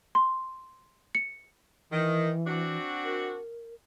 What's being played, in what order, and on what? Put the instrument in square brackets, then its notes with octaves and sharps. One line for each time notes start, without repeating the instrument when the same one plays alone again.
[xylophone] C6
C#7
[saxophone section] D#3 [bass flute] E3
[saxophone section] C4 D4 F#4
[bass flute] A#4